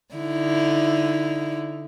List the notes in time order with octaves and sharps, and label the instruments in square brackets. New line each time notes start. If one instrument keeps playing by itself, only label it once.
[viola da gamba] D3 D#4 E4